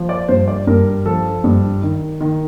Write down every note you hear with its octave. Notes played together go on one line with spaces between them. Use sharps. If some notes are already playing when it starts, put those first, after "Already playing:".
Already playing: F3
D5
G2 C5
D5
G2 A#4
F3 A4
G2
D#3
D#3